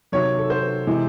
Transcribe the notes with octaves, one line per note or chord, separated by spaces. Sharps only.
C3 D#3 F#3 C#5
A4
C5
C3 E3 G#3